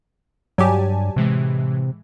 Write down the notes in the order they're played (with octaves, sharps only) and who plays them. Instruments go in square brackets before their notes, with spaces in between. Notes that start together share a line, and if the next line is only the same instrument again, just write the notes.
[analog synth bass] G2 [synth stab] F#3 G4 [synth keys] D5 G#5 A5
[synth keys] A2 E3 G#3 [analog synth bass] C3